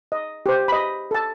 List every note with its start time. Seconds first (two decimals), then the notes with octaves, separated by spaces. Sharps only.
0.12 D#5
0.46 G4 C5
0.68 D#5 B5
1.11 A4 A5